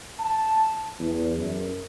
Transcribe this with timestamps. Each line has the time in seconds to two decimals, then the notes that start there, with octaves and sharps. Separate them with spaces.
0.18 A5
1.00 E2
1.37 F#2